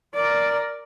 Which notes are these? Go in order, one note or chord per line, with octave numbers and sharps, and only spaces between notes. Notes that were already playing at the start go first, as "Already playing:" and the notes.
A#4 D5